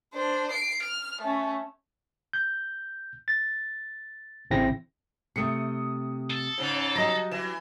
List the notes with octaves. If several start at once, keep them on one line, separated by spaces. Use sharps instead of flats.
D4 C5
C7 D7
F6
A3 C#4
G6
A6
A1 C#3 C4 E4 A#6
C3 A3 D#6 C#7
A4
G#2 C#3
F#3 G3 D#5 A#5 A#6
E3 E7